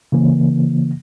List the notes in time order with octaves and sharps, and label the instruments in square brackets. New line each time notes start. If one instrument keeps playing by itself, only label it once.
[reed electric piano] C#3 E3 A#3